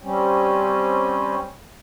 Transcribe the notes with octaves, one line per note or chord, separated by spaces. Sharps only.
G3 C4 C#4